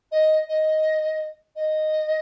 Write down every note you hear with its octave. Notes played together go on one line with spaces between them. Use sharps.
D#5
D#5
D#5